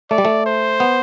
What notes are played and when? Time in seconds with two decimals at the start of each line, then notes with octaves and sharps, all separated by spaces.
0.11 A3 D5
0.18 G3
0.25 A3
0.46 C5
0.80 B3